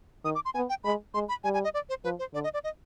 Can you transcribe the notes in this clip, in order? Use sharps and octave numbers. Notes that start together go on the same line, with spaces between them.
D#3 D#6
D6
C6
B3 G#5
G5
G#3 B5
G#3 C6
B5
G3 G#5
G#5
D#5
D5
C5
F3 B4
C5
D3 D5
D#5
D5
D#5